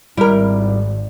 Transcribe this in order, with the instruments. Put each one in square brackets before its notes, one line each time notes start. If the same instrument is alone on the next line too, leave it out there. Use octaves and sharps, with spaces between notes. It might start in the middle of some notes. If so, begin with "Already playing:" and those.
[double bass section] G#1 [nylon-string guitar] G3 [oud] E4 A#4